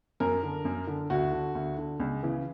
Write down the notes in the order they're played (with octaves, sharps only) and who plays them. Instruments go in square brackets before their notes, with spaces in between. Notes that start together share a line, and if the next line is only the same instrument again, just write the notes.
[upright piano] F#2 A#4
D3
F#2
D3
D2 F#4
D3
D2
D3
C#2
C#3 E3